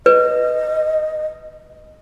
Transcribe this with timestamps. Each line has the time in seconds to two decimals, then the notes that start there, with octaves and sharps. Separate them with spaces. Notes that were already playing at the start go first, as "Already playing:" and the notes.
0.06 B4 D#5